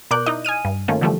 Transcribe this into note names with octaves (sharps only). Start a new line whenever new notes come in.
B2 A#4 D5 D6 F#6 G6
D#4 E4 D#5
G#5 D#6 F6 D#7
G2
D#3 A3 A#3 C#4 F4
D3 E3 F3 G3 A3